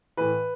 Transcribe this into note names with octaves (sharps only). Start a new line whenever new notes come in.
A2 E3 B4